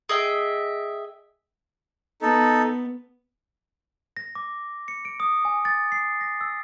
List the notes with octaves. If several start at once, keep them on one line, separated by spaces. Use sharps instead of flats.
G#4 D#5 E5 G5
B3 D#4 A4
A#6
D6
C#7
D7
D#6
G#5
A6
C7
A#6
E6